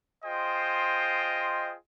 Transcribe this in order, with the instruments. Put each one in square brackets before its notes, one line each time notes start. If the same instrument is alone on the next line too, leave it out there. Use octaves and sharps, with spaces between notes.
[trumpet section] F4 G#4 C5 D#5 G5